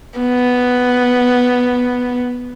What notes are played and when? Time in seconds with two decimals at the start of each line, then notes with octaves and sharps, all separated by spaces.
0.19 B3